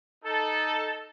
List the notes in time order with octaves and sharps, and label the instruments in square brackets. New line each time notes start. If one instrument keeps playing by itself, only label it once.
[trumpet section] D#4 A4